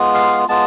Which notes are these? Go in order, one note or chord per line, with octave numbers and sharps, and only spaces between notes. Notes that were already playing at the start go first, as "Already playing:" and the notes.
Already playing: G#3 B3 F4
F5
G#3 B3 F4 A5